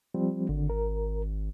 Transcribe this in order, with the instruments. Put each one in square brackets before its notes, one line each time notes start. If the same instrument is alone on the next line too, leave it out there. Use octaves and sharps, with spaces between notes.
[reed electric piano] F3 G3 C4
[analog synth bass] G#1 [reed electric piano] D3
[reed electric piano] A#4